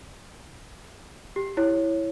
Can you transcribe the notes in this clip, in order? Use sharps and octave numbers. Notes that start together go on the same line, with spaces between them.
G4
E4 C#5